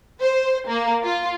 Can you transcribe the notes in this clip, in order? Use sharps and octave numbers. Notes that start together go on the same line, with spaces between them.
C5
A#3
F4